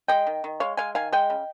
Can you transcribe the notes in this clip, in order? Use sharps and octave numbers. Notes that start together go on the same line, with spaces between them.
G#3 D#5 G5
D#3
D#3
G#3 C#5 F5
G#3 F5 G#5
D#3 F5 G#5
G#3 D#5 G5
C#3